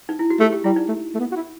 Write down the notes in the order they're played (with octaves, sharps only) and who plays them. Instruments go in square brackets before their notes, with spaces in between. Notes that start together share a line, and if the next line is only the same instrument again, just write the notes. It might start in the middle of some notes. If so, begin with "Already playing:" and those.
[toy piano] D#4
E4
F#4
[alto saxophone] A3 [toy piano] G4
[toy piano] G4
[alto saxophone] G3 [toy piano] E4
[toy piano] D#4
[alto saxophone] A3
A3
B3
F#4
E4